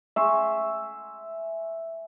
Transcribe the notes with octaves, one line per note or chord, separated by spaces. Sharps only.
E5 G#5 C6 C#6